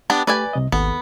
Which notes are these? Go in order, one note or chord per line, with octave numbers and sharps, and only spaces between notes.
B3 D4 G4 A5
A3 G4 B4 D5 G#5
C2 C3 D#5
G#1 D#2 B3 A4